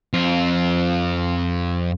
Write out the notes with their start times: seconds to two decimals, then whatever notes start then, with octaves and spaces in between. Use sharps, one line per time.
0.13 F2 F4